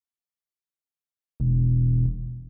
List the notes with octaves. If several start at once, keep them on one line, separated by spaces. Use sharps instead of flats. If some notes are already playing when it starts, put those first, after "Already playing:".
E1